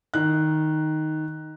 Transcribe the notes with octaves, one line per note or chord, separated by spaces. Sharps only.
D#3 F#6